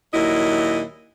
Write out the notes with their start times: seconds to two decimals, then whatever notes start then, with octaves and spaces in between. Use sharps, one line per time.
0.14 D#2 A#2 F#3 E4 D#5